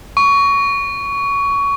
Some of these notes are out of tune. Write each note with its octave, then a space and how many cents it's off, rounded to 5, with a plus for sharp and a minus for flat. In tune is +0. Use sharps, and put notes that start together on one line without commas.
C#6 +20